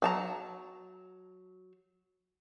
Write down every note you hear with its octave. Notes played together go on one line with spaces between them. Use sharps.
F#3 A5 A#5